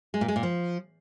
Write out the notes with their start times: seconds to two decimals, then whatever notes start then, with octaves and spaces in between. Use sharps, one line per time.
0.14 G#3
0.21 A#2
0.28 G#3
0.36 A#2
0.43 F3